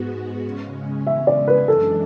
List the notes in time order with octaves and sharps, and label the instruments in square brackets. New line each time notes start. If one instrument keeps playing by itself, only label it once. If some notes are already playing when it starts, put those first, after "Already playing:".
Already playing: [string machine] G#2 G#3 B3 F#4
C#3 G#3 C#4
[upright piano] E5
D5
B4
[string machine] F#2 E3 G#3 D4 [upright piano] A4